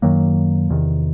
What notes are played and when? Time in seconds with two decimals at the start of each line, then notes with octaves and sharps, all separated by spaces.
0.02 F#2 D#3 F#3 A#3
0.70 E2 C3 D#3